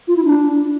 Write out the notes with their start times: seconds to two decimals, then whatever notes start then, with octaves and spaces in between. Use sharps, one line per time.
0.08 F4
0.17 E4
0.25 D4